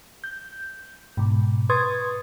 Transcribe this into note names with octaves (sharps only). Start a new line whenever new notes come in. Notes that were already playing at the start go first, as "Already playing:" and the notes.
G6
G#2 B2
B4 C6 C#6 D#6 G#6 A6